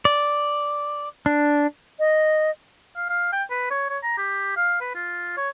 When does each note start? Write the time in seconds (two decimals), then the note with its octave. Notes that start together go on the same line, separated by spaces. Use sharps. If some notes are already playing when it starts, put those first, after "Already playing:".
0.05 D5
1.26 D4
1.99 D#5
2.96 F5
3.09 F5
3.32 G5
3.50 B4
3.70 C#5
3.89 C#5
4.03 A#5
4.18 G4
4.57 F5
4.81 B4
4.95 F4
5.37 C#5